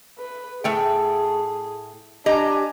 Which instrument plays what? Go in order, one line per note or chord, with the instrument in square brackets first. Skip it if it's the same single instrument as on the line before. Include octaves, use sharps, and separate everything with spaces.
[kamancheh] B4
[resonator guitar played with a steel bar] A2 A3 G5 [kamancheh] G#4
[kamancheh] D4 G#5 [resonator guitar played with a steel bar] G4 D#5 A#5